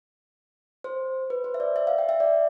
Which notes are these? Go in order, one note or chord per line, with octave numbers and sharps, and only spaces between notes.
C5
B4
C5
E5
D5
E5
F5
G5
E5
D5